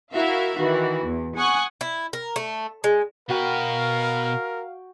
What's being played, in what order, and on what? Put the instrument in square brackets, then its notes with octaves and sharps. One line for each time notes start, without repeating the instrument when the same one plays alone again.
[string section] E4 F#4 A#4 E5 F5
D#3 E3 F#4
E2
F#5 G#5 C#6 D#6 F#6
[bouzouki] E4
A#4
A3
G#3
[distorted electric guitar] B2 B4 [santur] F#4 G5 [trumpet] A#4 [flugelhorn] F5